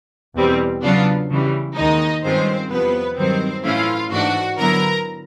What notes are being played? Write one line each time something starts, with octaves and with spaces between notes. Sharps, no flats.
E2 B2 G3 C4
C#3 F#3 B3 D4 F4
C#3 E3 G3
D#2 D#3 G#3 D#4 D#5
G2 D#3 G#3 C4 C#4 F4 C5
E2 C3 F3 B3 B4
G2 D#3 F#3 C4 C5
A2 E3 A3 C#4 E4 F4 F5
G#2 E3 A3 D4 F#4 F#5
D3 F#3 B3 E4 A#4 A#5